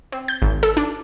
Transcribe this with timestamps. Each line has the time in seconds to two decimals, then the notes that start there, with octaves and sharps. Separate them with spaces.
0.12 C4
0.28 G6
0.42 G#1
0.63 A4
0.77 D4